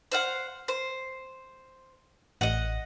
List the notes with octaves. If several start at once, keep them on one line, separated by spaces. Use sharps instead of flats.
C5 F5 F#5
C5
A1 D#5 F#5